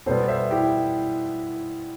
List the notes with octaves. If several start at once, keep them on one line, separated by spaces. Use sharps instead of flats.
B2 G3 B3 A4 C5
C5 E5
E4 G4